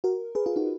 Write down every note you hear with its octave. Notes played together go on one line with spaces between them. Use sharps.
F#4 A#4
G#4 B4
F4 G#4
D#4 F#4